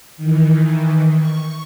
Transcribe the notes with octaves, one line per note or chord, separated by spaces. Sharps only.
D#3 E3
C#6